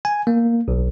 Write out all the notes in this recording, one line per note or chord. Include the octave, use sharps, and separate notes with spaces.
G#5
A#3
B1